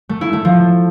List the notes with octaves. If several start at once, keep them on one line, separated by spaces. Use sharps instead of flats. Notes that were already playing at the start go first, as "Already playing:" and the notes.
A3
E4
A3
F3